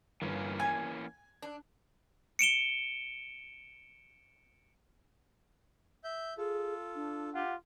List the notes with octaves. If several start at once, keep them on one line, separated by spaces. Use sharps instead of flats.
G1 E3 A#3 C#4
G#5 G#6
D4
C#7 D7 E7 G7
E5 G6
F4 G#4 A4
D4
F4 G4 F#5